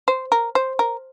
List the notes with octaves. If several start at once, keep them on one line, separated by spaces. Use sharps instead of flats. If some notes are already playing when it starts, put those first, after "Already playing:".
C5
A#4
C5
A#4